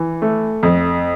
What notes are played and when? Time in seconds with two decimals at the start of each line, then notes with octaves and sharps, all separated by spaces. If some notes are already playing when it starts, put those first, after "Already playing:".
Already playing: E3
0.22 A3
0.63 F2